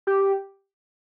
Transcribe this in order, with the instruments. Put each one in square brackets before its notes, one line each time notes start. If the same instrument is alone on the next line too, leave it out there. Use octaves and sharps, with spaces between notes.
[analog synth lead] G4